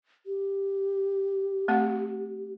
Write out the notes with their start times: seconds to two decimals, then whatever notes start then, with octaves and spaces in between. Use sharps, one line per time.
0.26 G4
1.68 A3 C4 F#5